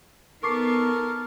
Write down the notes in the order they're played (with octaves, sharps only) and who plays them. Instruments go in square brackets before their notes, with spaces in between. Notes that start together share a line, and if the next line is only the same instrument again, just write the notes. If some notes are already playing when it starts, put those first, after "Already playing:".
[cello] B3 D#4 [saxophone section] A4 A#4 [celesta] C#6 D6 C7